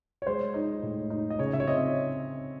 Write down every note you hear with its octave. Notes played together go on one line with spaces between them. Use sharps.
C#5
G#3 C5
D#4
A2
D#4
D#5
C#3 C#5
E5
C#5
C4 D#5